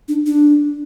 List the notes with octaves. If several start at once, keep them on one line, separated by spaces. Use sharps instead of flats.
D4
D4